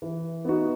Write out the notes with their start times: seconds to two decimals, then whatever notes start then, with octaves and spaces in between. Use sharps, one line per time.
0.02 E3
0.45 B3 D#4 F#4